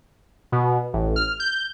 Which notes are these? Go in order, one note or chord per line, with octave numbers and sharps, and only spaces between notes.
B2
A1
F6
G6